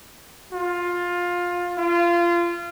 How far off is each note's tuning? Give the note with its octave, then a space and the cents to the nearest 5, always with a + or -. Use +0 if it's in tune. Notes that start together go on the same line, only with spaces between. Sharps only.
F4 +15
F4 -25